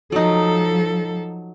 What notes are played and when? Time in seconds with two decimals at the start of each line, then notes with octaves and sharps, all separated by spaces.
0.12 F3 F#3 D#4 A4